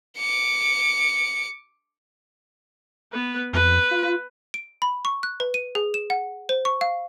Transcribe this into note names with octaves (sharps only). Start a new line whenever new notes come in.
D6 C#7
B3 B4
F2 B4
F4
D7
B5
C#6
F#6
B4
D#7
G#4
E7
F#5
C5
C#6
F5